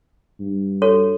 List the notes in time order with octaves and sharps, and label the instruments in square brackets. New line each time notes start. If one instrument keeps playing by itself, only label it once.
[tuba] G2
[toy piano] F#4 A4 C#5